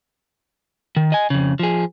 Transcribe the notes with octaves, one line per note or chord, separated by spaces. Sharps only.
D#3
D#5 G#5
F2 C#3
F3 G#4